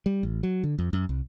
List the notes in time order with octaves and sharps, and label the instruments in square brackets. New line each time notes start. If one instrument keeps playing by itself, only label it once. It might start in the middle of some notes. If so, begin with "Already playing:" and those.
[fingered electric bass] G3
A1
F#3
D3
F2
F#2
C2